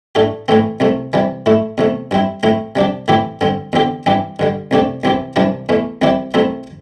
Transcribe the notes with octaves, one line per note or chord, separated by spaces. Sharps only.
A2 A3 D4 G4
A2 E3 A3 C4
C2 C3 A3
C3 E3 G3
A2 A3 E4
E2 C3 A3
G2 G3 C4 E4
A2 A3 C4 E4
C3 G3 D4 G4
A2 E3 C4 E4 G4
G2 D3 C4
E2 D3 C4 G4
G2 E3 C4 G4
G2 D3 G3
C2 C3 A3 D4 G4
C2 C3 E3 C4 G4
C2 C3 E3 G3 D4
E2 E3 A3
C2 C3 G3 E4 G4
C2 C3 A3 C4 E4